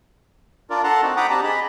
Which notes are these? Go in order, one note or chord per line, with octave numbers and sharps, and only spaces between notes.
D4 F4 A#4 D5
A4 F#5 A5 A#5 C6
C4 D#4 F#4
F#5 G5 A#5 B5 D6 D#6
C4 D4 G4 A5 A#5
G#4 D#5 B5